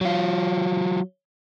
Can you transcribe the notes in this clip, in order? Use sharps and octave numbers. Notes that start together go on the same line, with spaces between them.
F#3 F4